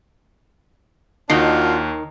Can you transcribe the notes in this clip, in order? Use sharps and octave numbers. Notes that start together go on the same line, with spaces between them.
D#2 D#3 D4 F4 F#4 C7